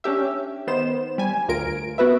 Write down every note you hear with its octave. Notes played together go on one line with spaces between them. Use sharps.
C#4 D4 G4 E5
D#3 B3 C5 E7
G3 G#5
D2 F4 A#4 D7
B3 F#4 B4 E5